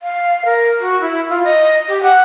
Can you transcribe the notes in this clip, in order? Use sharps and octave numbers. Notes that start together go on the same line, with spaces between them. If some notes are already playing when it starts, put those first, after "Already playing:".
F5
A#4
F#4
E4
F4
D#5
G4
F#5